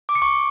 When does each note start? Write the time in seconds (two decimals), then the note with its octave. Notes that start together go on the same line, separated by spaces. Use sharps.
0.09 D6
0.15 C#7
0.22 C#6